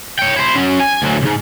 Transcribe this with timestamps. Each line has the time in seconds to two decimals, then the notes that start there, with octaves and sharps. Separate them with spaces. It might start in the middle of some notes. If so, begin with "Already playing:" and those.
0.19 C#5 G5
0.36 E4 C5
0.55 C#4 F#4
0.80 G#5
1.02 D2 F#3
1.22 B1 G#2